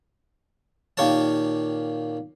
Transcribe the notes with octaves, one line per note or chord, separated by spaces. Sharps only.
A#2 D#3 G4 C#5 F5 A5